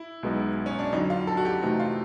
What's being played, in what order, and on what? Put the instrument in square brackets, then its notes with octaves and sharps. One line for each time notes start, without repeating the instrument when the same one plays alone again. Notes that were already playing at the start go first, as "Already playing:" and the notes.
Already playing: [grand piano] E4
[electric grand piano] B1 B2 G#3 B3 D#4
[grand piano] C#4
D4
[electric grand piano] F2 D3 F#3 [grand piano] D#4
[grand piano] F4
A4
F#4
G4
[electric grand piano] C3 E3 A3 C4 D#4 [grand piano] F#4
[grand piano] F4